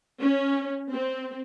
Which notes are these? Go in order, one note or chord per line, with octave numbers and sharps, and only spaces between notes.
C#4
C4